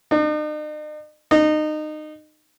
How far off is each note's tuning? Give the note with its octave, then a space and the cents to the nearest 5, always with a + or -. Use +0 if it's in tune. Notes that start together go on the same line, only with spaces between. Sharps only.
D#4 -45
D#4 -25